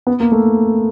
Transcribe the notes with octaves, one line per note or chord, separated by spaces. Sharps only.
B3
A#3
A3